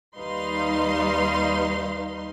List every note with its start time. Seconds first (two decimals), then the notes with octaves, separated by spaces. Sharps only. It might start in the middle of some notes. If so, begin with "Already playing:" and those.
0.17 D#2 G3 D#4 B4 F5 C6